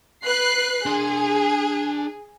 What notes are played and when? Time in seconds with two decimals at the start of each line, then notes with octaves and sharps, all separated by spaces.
0.24 B4 F#6 C7
0.86 D4 G#4 C6